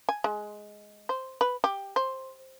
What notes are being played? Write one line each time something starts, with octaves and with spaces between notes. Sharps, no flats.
G#5
G#3
C5
B4
G4
C5